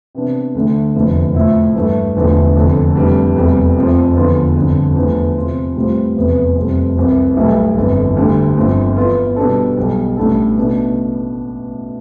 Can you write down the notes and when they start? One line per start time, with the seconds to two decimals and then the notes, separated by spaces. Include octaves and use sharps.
0.15 C3 E3 B3 D4
0.55 D2 D3 A3
0.95 F1 E2 D3 F3 A3
1.35 A2 F3 A3 E4
1.75 G2 E3 A3
2.16 E1 E2 D3 F3 A3
2.55 F1 F2 D3
2.95 F1 F2 E3 G3 D4
3.36 F1 E2 C3 G3
3.76 F1 F2 C3 F3
4.16 E2 D3 F3 B3 F4
4.56 G1 F2 D3
4.95 E2 D3 F3 A3
5.36 C3 F3 C4 F4
5.76 A2 G3 C4 F4 C5
6.16 F1 E2 C3 E3 B3
6.56 F1 F2 E3 G3 C4
6.97 C2 C3 E3
7.36 B1 A2 G3 B3 E4
7.76 G1 F2 E3
8.17 D2 D3 G3
8.57 G1 G2 F3 C4
8.96 E3 B3 F4
9.36 B2 G3 B3 D4 A4
9.77 B1 B2 G3
10.17 A1 A2 G3 D4 A4
10.58 B2 A3 D4